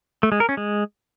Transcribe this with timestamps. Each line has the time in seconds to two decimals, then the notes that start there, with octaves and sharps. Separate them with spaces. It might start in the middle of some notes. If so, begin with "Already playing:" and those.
0.23 A3
0.32 G#3
0.40 A#4
0.49 C#4
0.57 G#3